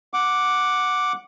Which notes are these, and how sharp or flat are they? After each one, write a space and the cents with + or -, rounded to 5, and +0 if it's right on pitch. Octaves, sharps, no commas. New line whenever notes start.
F#5 -5 D6 +0